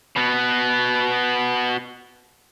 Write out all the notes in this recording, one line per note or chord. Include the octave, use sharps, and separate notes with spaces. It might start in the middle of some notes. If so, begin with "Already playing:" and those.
B2 B3